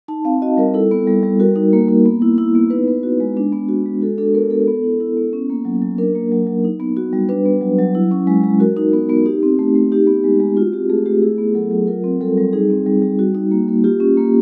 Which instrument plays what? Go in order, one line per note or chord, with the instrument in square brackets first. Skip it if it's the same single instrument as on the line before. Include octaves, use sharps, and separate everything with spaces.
[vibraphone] D#4 A5
C4 F5
F#4 D#5
G3 A#4
E4 A4
B3
G3 A4
G3
F#4 A#4
D#4
A#3
A#3
B3
E4
E4
B3
D#4 B4
B3
F#4
G#3
D4
B3
F#4
G#3
F#4 A4
D4 A4
B3 A#4
B3 A4
B3
E4
E4
B3
C#4
A#3
F#3
F#3
D4 A#4
A#3
F#3
F#3
D#4
B3
F#4
G3
D4 B4
B3
F#3
F#3
E4
C#4
G#3
G#3
F#4 A#4
D#4
B3
B3
D#4 G4
C4
A3
A3
D#4 G4
B3
G#3
G#3
F4 F#4
C4 G4
A3 G#4
A3 G4
E4 G#4
B3
F#3 A4
F#3
F4 A#4
C4
G3 A4
G3
D#4 G#4
C4
G3
G3
F#4
D#4
A#3
A#3
F4 G4
C#4
A#3